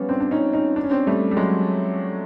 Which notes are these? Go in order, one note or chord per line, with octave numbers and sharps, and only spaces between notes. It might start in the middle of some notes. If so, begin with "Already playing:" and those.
Already playing: F3 G3 B3 C#4
C4 D4
D4
C#4 D#4
C#4 D#4
D4
C#4
C4 D4
G3 A3
G3
F#3 G#3